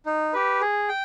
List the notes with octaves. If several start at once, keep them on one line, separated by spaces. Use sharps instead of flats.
D#4
G4 B4
G#4
G5